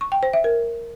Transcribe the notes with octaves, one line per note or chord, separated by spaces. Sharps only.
C#6
G5
C5
E5
A#4